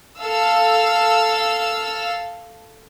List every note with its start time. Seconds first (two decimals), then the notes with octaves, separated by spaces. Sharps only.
0.19 A4 F5 E6